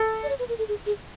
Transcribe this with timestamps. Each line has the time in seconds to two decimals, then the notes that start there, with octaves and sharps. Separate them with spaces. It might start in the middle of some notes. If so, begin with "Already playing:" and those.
Already playing: A4
0.23 D5
0.29 C#5
0.39 B4
0.49 A#4
0.59 A4
0.68 G#4
0.86 G#4